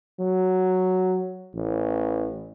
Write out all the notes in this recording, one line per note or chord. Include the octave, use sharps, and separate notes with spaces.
F#3
A1